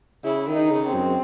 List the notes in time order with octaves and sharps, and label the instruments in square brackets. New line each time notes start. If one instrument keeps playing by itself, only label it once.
[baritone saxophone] C#3 [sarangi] E4
[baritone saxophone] D#3
[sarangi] D#4
[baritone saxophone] C#3
[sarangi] C4
[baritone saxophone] F#2